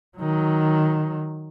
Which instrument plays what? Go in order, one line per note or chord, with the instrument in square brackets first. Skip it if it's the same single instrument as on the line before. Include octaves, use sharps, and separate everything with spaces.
[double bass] D#3 F#3